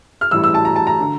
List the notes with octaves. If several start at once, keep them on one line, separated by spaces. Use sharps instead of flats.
F6
A1 A2 E3 G3 E6
E6
A5
A#5
A5
A#5
D3